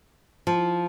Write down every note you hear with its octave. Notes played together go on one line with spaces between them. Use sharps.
F3